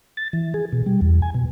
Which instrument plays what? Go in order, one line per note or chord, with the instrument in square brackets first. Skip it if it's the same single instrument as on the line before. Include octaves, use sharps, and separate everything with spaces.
[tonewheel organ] A6
E3
G#4
B2
G3
E2
G#5
B2